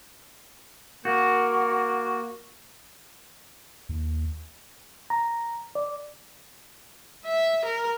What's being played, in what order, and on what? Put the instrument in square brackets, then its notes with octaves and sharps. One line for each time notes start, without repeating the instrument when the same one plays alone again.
[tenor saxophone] A#3 [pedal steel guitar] F#4
[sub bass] D#2
[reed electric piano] A#5
D5
[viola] E5
A#4